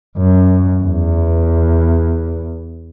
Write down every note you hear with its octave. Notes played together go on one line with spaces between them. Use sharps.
F#2
E2